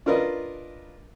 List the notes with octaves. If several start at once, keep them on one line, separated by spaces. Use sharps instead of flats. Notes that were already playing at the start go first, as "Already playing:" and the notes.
D4 F4 A#4 B4 D#5